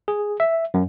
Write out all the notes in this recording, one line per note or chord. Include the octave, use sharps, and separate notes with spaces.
G#4
E5
F#2